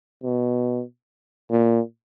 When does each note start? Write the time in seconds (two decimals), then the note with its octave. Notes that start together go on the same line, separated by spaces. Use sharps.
0.23 B2
1.50 A#2